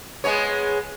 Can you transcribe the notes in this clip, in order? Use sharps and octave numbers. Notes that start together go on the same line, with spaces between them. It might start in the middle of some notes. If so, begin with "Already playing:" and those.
G#3 B3 C#5